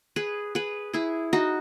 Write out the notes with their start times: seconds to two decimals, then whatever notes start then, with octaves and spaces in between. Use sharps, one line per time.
0.16 G#4 B4
0.55 G#4 B4
0.94 E4 G#4
1.33 D#4 F#4